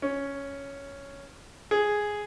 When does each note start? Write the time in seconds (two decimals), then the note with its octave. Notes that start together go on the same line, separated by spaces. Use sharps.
0.02 C#4
1.71 G#4